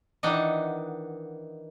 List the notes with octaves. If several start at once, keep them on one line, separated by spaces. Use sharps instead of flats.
D#3 E3 D4 D#4 D#5 F#5